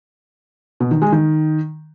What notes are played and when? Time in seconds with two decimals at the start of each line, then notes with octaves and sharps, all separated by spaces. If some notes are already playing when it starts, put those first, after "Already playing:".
0.80 B2
0.91 D#3
1.02 G#3
1.12 D#3